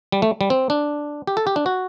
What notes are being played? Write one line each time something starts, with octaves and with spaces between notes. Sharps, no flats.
G3
A3
G3
C4
D4
G4
A4
G4
D4
F#4